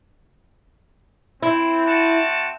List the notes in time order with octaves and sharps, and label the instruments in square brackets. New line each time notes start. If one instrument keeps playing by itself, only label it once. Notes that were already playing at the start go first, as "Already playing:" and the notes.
[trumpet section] C4 [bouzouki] E4
[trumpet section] C4 F#4 A5